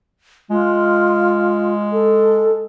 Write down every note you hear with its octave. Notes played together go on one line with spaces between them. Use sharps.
G#3 F4
A4